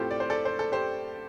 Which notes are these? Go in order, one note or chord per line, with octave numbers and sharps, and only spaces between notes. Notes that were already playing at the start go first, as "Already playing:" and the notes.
Already playing: A2 A3 C4 F4 G4 A4 C5
D5
C5
A4 D5
C5
A4
G4 C5